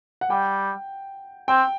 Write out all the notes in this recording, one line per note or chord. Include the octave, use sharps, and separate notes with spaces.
F#5
G3 G5
C4 G5